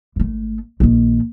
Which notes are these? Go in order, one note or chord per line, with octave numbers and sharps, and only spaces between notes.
G#1 A3
A#1 D#3